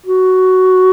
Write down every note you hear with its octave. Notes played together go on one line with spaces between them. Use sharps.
F#4